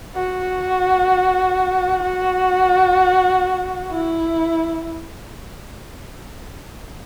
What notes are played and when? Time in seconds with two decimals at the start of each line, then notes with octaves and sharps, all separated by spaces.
0.16 F#4
2.03 F#4
3.91 E4